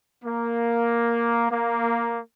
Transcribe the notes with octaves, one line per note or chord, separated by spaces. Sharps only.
A#3
A#3